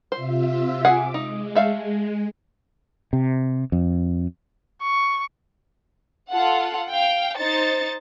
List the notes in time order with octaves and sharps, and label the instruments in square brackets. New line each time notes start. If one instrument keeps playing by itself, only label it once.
[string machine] C3 F4 E5 [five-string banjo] C5
[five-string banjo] G#4 F#5 G#5 [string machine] D6
[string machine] G#3 [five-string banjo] D#4
[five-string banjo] A3 E5 F5
[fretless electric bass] C3
F2
[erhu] C#6
[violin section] F4 A4 F#5
F5 G5
D#4 C5 A6 C#7